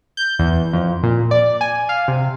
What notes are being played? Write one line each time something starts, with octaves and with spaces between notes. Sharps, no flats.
G6
E2
F2
A#2
D5
G#5
F5
C3